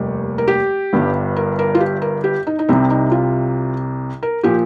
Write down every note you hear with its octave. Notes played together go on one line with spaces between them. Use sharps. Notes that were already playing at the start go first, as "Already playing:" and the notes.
Already playing: F1 D#2 G3
A#4
G4
G1 G2 G3
A#4
A#4
F4
G4
A#4
G4
D#4
D#4
C2 C3 G3 C4
D#4
F4
A#4
A#2 F3 G4